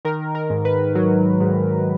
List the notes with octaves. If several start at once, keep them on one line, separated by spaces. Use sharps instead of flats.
D#3 A#4
A#4
G#2
B4
F#3
G#2